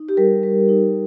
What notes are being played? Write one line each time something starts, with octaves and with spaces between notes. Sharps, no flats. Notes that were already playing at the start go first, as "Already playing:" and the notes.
Already playing: D#4
G4
G3 A#4
G3
D#4